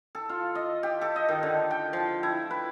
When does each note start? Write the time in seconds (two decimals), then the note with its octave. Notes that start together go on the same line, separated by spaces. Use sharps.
0.15 A4
0.29 F4
0.55 D#5
0.83 G4
1.01 A4
1.16 D#5
1.29 D#3
1.43 D3
1.71 G5
1.93 F3
2.23 E4
2.51 B4